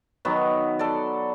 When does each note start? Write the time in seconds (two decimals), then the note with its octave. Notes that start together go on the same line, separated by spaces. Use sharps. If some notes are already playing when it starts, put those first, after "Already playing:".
0.25 D#3 F#3 B3
0.79 A4 D5